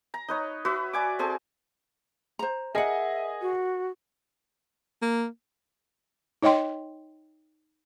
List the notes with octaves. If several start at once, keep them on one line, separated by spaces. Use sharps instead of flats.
A#5
D#4 B4 C#5
F#4 B4 E5
D5 G#5 D6
C4 G#4 A4 A5
C5 A#5
G#4 A#4 D#5 E5 F#5 G#5
F#4
A#3
D#4 C#5 D#5 G5 C6